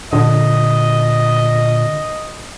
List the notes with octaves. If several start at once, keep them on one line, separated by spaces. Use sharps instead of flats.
A#2 D3 D#5